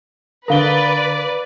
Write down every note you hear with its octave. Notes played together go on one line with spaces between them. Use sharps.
D3 A#4 B4 D5 F5 A#5 G7